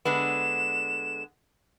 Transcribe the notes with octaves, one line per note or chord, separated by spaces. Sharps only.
D3 G#3 B3 E7